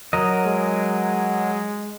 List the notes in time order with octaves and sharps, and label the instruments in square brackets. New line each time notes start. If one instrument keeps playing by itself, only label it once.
[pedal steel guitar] F#3 A#4 D#5
[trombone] G#3